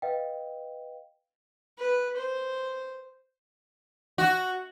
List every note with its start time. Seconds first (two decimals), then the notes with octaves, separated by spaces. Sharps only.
0.02 B4 D#5 F5 G5
1.78 B4
2.16 C5
4.18 F#4